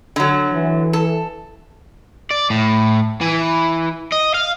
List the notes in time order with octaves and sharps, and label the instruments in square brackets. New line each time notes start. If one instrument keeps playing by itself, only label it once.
[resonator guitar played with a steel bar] D3 F#3
[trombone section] E3
[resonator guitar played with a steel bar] A4
[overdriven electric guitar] D5
A2
E3
D#5
F5